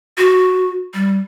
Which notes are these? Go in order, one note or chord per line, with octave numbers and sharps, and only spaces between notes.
F#4
G3